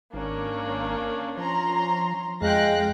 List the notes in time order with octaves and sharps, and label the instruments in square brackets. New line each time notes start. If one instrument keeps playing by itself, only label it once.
[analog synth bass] G#1 [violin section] A#3 C#4 [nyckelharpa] D4
[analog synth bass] F3 [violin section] C#4 A#5 C6
[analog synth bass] F2 [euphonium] G#3 [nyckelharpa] F5 G5 [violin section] F#6 A#6